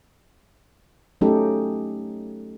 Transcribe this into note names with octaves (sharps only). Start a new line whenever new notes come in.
F#3 A3 C#4 D#4 G4 A4